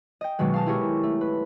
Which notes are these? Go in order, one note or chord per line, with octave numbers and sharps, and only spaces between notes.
D#5 G5
B2 D#3 F#3 G#3
F5 A5
E4 G4 G#4 A#4 C#5
A3
B4